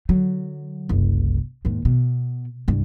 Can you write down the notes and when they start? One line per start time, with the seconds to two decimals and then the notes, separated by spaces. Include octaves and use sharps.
0.09 D3 F#3
0.89 F#1 C2
1.65 D#2 G#2
1.85 B2
2.68 C2 G2